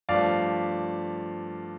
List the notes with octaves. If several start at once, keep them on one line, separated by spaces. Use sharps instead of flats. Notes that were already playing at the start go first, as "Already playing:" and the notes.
G2 F3 A3 D5 F5